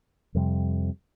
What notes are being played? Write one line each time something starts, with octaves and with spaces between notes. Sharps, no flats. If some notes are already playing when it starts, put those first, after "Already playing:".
F2 C3 G3